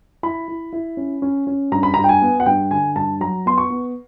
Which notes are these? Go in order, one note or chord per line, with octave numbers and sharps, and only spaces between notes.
E4 B5
E4
E4
C#4
C#4
C#4
G2 A#5
B5
G2 A#5
G5
G#5
B3
F#5
G2 G5
D3 G#5
G2 A5
F#3 A#5
B3 C6
C#6
B3